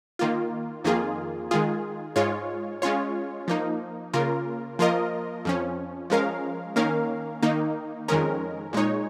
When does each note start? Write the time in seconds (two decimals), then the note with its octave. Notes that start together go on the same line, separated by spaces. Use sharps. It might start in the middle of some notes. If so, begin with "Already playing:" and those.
0.19 D#3 A#3 F4
0.84 F2 D#3 A#3 F4 G#4
1.51 D#3 G#3 F4 G#4
2.16 G#2 G#3 F4 C#5
2.82 G#3 C#4 F4 C#5
3.48 F3 A#3 D#4
4.14 C#3 A#3 F4 A#4
4.79 F3 A#3 F4 A#4 D#5
5.45 F2 F3 C#4
6.10 F3 G#3 C#4 A#4 F5
6.76 D#3 A#3 C#4 A#4 F5
7.42 D#3 A#3 D#4
8.08 F2 D#3 G#3 C#4 A#4
8.73 A#2 G#3 D#4 C#5